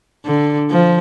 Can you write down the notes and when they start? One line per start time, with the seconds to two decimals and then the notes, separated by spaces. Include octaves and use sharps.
0.25 D3
0.70 F3